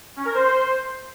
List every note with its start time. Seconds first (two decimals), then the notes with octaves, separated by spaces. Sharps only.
0.17 C#4
0.26 A#4
0.34 C5